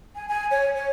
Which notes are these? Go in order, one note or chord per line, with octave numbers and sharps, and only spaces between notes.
G#5
G#5
C#5
C#5